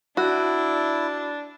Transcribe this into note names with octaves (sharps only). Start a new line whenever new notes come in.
D4 E4 F#4